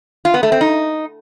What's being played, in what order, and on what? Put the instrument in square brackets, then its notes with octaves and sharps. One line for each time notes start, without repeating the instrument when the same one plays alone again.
[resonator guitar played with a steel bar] F4
B3
A3
C4
D#4